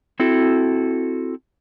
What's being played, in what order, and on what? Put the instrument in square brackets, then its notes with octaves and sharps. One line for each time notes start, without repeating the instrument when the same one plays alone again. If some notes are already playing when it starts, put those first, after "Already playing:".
[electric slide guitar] C4 E4 F#4 A4